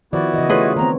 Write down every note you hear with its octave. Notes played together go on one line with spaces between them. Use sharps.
D#3 F3 B3 E4 F#4 D5
C#3 E3 D#5
A3 F4 G#4 B4 C#5
D#3 B3 C4 A#5